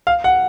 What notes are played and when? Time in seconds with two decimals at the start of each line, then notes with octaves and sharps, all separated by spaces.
0.07 F5
0.24 F#5